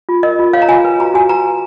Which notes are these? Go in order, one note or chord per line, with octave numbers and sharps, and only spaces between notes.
F4
A#4 D#5
F4
C#5 F5
A#5
F4 G#5
B4
F#4 A#5
F#4 G#5
B4 A#5
F#4